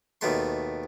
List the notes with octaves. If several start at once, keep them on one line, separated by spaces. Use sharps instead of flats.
D#2 B2 A3 C6